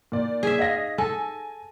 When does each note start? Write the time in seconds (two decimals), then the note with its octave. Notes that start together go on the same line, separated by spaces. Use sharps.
0.12 A#2 D5
0.43 G#4 E5
0.59 D#5 F5 A#6
0.98 A4 G#5